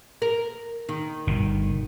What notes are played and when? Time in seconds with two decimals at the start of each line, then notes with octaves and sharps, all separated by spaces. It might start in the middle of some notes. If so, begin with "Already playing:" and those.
0.22 A#4
0.89 D#3
1.27 G1 B2